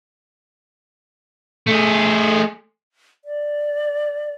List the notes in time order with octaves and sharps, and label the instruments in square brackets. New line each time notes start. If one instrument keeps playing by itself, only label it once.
[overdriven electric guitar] A3 G#4
[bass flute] D5